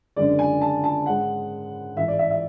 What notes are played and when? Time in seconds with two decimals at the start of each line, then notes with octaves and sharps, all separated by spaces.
0.16 F#1 F#2 D3 G#3 D5
0.39 G#5
0.61 A5
0.84 A5
1.06 G#2 G#3 C#4 F#5
1.96 A1 G#2 E3 E5
2.08 D5
2.19 E5
2.31 E5